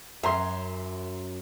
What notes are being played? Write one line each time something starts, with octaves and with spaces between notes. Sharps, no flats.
F#2 E5 A#5 C6